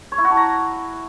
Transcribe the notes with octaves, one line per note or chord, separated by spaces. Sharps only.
C#5
E4
F#4
A5
A#5